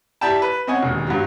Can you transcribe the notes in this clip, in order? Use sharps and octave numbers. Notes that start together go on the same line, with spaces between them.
E4 G4 D5 E5 G5 A5
B4
C4 C#4 D#5 F#5 G#5
E1 D#2
G2 F#3